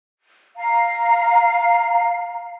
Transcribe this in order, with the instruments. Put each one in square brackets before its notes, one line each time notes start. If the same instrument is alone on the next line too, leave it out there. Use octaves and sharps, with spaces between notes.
[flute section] F5 A#5